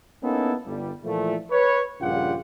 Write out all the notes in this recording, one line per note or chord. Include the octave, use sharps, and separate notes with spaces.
A#3 B3 C#4 D#4 E4 A4
G1 G3
A#2 E3 F3 A3
B4 C#5
A#1 G2 C#3 F4 G4 F#5